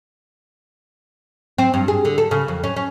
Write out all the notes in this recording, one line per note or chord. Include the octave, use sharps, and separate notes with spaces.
C4
G2
G#4
D3
A4
C#3
F2
C#4
C#4